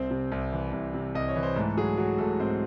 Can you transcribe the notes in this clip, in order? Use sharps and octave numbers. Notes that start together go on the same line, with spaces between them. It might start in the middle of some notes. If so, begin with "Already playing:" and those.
Already playing: C2 C4 C5
C3
C2
E3
C2
C3
C2 D#5
C#5
E3
C5
G#2 A3 A4
F#3 G#3 G#4
F#3 F#4
G#2 A3 A4
G#2 C4 C5